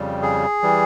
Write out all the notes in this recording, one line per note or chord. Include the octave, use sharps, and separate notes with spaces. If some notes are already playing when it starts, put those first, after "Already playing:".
Already playing: F2 C#3 G3
G#4
E3 G3